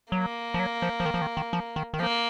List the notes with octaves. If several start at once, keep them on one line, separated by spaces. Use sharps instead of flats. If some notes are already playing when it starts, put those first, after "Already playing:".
F#3 A#3
F3
F#3
F3
F3
D#3
F3
D#3
D#3
F3
D#3
D#3
F3 A#3